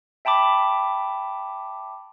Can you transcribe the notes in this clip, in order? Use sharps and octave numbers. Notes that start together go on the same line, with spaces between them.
E5 G5 A5 B5 D6